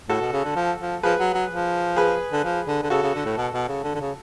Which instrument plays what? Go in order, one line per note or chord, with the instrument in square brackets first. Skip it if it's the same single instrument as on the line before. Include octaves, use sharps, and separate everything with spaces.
[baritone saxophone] A2 [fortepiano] F#4 A4
[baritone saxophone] B2
C#3
D3
F3
F3
[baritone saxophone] F3 [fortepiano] G#4 B4
[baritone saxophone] F#3
F#3
F3
[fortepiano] G#4 B4
[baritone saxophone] D3
F3
D3
D3
[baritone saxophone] C#3 [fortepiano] F#4 A4
[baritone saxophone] C#3
D3
A2
B2
B2
C#3
D3
D3
C#3